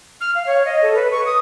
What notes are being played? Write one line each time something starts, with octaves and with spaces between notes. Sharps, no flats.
F6
F5
C#5
D#5
A4
B4
C#6
D#6